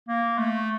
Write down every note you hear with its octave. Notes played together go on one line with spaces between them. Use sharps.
A#3
A3